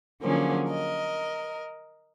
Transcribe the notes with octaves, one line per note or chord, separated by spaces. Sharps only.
D3 F3 F#3 A#3 C#4 G#4
A#4 D#5